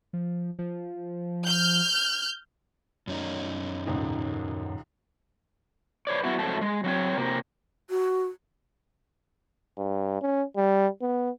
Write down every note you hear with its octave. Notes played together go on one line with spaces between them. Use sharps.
F3
F3
F6 G6
F#2 C#4 D#4
D#1 C#2 G#2
B4 C#5 D5
F#3 B3 E4 F#4
F2 G#2 F#3 A3 A5
G#3
F#3 C4 C#5
C3 A#3
F#4
G2
C#4
G3
B3